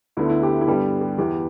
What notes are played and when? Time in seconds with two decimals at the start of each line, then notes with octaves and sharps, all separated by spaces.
0.17 D2 D3 B3 E4
0.30 E4
0.43 G4
0.61 E4
0.67 G2 D3 G3 B3 G4
1.01 G4
1.18 E2 E3 B3 G4